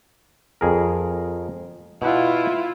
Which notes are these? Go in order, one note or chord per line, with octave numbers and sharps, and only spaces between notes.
F2 G#4 A#4
B2 E4 F4 F#5